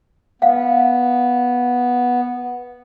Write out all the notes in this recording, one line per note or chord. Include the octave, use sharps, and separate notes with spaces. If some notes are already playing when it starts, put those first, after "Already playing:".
B3 F5 F#5